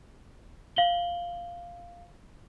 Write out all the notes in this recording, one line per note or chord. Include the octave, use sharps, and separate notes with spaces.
F5 F#7 G7